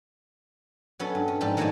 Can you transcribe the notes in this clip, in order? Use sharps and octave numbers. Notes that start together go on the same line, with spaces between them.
F#3 B3 C#4 F#4 A4
G2
C#4
G#2 F3 G4 A4 D5
D#3 F#3 A#3 D5 G#5 A5